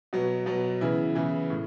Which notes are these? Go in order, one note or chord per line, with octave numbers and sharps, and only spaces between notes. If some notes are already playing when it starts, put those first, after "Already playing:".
B2 F#3 B3
B2 F#3 B3
C#3 E3 B3 E4
C#3 E3 B3 E4
A2